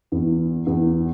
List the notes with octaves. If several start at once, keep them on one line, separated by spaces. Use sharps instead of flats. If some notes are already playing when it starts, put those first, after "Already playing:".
E2
E2